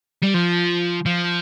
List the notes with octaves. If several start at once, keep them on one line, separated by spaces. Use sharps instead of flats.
G3
F3
F3